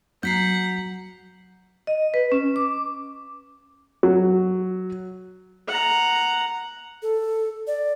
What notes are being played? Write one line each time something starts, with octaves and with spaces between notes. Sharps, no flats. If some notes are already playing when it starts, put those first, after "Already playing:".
F#3 F#5 A#5 G6 B6 C7
D#5
B4
C#4
D6
F#3
F#5 A#5
A4
D5